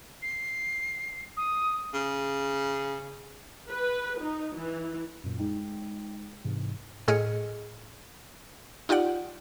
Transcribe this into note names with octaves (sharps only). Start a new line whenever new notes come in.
C7
D#6
C#3
B4
D#4
E3
F#2 A#2
G#3 D#4 G5
G#2 C3 E3
A2 G#4 D#5 F6 C#7
D#4 F4 G4 D5 F#5